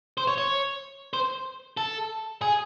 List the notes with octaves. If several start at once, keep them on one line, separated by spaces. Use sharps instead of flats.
C5
C#5
C#5
C5
A4
G#4